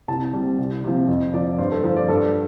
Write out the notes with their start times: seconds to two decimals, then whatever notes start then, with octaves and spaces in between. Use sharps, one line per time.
0.08 C2 A5
0.33 C3 G3
0.58 C2
0.84 C3 F3
1.08 F2
1.34 F3 D5
1.58 G2 C5
1.72 A4
1.84 F3 C5
1.96 D5
2.08 G2 A4